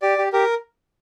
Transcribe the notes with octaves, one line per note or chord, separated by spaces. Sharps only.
G4 D5
G4
G4 A#4